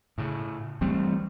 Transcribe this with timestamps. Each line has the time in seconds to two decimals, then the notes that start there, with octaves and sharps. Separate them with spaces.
0.18 A2 C#3
0.81 E3 G3 A3 C4